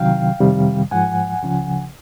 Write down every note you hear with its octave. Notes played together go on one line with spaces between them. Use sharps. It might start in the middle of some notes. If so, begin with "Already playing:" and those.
Already playing: C2 C3 D#3 F#3 F5 G5
F2 C3 D#3 G3
G#2 F3 F#5 G#5
C#2 C#3 F3